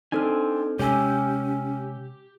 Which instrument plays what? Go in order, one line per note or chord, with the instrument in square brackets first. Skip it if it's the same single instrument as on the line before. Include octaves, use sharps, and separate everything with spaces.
[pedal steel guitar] C4 D4 G#5 [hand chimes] D#4 A4 F6
[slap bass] C3 G#3 [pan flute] C#4 [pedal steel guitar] G4 [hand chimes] C#5 G#5 E6